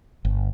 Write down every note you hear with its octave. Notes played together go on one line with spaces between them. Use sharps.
G1